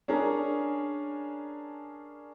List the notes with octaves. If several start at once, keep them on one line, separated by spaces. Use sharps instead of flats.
C#4 D4 G#4 A#4